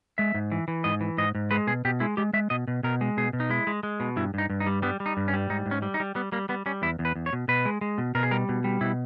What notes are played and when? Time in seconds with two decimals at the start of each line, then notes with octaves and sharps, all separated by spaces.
0.18 G#3 E5
0.34 G#2
0.52 E3
0.68 E3
0.84 G#2 D#5
1.01 E3
1.18 G#2 D#5
1.35 G#2
1.51 G#3 B4
1.67 B2 G#4
1.85 B2 G4
2.00 G#3 E4
2.17 G#3 G4
2.33 G#3 E5
2.50 B2 D#5
2.68 B2
2.83 B2 A#4
3.01 G#3
3.17 B2 G#4
3.33 B2
3.40 D#4
3.50 G#3 E4
3.67 G#3
3.83 G#3
4.00 B2
4.16 G2 E4
4.34 G2 D#4
4.50 G2
4.60 D#4
4.66 G3
4.82 G3 B3
5.00 G3
5.06 D#4
5.17 G2
5.28 C#4
5.33 G3
5.50 G#2 D#4
5.66 G#2
5.71 C#4
5.82 G3
5.94 D#4
6.00 G3
6.15 G3 B3
6.32 G3 A#3
6.49 G3 B3
6.66 G3 C#4
6.82 E2 E4
6.99 E2
7.05 B4
7.15 E2
7.26 C#5
7.33 B2
7.48 B2 B4
7.65 G#3
7.81 G#3
7.98 B2
8.15 B2 A#4
8.23 G#4
8.31 G3 A#4
8.49 B2
8.64 G3
8.81 B2 E4